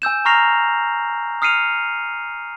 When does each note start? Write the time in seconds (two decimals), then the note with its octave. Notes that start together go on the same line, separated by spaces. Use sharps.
0.02 G#5 E6 G6 E7
0.25 A#5 C#6 F6 A#6 C7 F7
1.42 D#6 F6 C7 C#7 D#7 F7